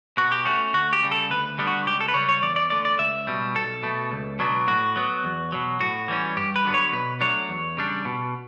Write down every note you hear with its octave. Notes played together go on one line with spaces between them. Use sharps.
B2 F#4
G4
A3 C#4 F#4
D2 F#4
G4
C#3 G3
A4
D2 B4
D3 G3 B3 D4
F#4
C#2 G4
A4
B4
C#3 G3 C#5
C#5
E2 D5
D5
D3 A3 D5
D5
C#2 E5
B2 G3
B1 A4
B2 A3
C#2
B2 F#3 B3 D4
A2 F#4
F#3 B3
E2
B2 F#3
A2 F#4
E3 G3 C#4
G2 G4
B4
D3 F#3 B3 D4
C#5
B2 B4
F#3 A3 D4 C#5
E2
C#3 G3 D4
B2